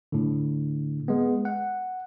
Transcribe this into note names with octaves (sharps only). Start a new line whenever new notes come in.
A2 D3
G#3 B3
F#5